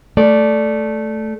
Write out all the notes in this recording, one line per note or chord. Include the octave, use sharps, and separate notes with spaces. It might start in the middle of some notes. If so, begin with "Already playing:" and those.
A3 D5